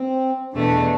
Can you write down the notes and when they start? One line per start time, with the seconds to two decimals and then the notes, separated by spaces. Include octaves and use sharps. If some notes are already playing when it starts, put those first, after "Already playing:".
Already playing: C4
0.54 E2 B2 A3 D4